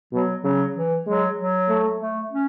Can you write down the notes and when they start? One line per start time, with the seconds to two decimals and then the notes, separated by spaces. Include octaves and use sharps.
0.13 B2 F#3
0.44 C#3 F#3
0.76 E3
1.07 F#3 G#3
1.37 F#3
1.69 A3
2.00 A3
2.31 C#4